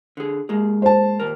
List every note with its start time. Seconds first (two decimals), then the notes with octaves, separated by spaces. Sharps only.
0.17 D3 G#4
0.49 G#3 A#3 G#4
0.82 C5 A5
1.20 D#2 A#2 A#4